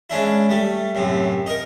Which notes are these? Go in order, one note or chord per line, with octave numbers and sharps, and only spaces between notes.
G#3 C#4 D4 E4
G3 A3
F#2 A2 C3
D#4 A#4